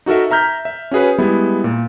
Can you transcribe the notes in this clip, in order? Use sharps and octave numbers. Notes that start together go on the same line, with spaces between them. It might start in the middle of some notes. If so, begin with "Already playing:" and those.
D#4 F#4 A4 A#4 E5
E5 A#5 F6 G6 B6
E5
C#4 F#4 G#4 B4
G3 G#3 B3 E4
A#2